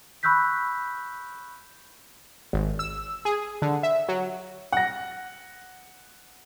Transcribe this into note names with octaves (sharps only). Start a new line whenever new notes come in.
B5 C#6 E6 F#6 G6 B6
G#1
E6
G#4
D3
E5
F#3
F#5 A#6